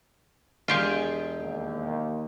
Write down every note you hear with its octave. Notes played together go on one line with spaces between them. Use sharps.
E1 F4 G4 G#4 G6
D#2